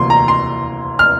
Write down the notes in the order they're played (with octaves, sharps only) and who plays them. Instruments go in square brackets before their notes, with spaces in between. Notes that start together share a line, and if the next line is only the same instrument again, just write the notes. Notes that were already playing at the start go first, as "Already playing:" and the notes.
Already playing: [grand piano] D2 C3 E3 A#3 C6
A#5
C6
F6